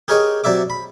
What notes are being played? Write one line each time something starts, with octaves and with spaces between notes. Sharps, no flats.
G4 G#4 A#4 C#5 D#5 G5
C3 F#3 D5 E5 D6
B5